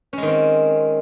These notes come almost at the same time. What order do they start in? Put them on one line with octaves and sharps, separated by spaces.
C#4 G#3 D#3 C4